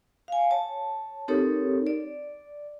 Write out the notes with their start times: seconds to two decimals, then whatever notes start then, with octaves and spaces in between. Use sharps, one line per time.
0.28 F5 G#5
0.51 C#5 A5
1.28 C4 D#4 G4 A4 A#4 C#5
1.87 D5